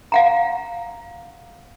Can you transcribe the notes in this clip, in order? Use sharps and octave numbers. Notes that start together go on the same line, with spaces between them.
F5 F#5 A#5